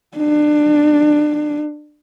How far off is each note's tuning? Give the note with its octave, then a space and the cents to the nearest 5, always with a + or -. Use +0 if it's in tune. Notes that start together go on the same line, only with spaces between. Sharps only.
D4 +25